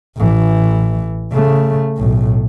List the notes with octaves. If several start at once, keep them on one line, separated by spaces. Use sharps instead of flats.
A1 E3
C#3 A3
B1 A2